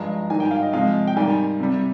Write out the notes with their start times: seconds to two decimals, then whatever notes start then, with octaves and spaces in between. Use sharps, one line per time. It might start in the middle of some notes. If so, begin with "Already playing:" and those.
Already playing: G2 F3 G#3 A#5
0.30 G#2 D#3 G3 G#5
0.40 G5
0.51 F5
0.62 D#5
0.73 C3 F3 G#3 F5
1.07 G5
1.16 G#2 D#3 G3 G#5
1.60 C3 G3